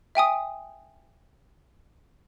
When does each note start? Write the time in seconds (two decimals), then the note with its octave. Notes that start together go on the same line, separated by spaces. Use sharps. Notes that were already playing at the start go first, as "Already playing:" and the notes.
0.15 E5 G5 G#5 D#6